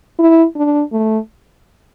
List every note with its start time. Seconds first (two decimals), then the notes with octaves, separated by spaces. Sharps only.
0.19 E4
0.56 D4
0.92 A3